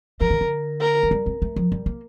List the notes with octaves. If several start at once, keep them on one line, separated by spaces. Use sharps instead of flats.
F3 A#4
D#3
D3
A#4
F3
G3
C4
A3
F3
G3
A#3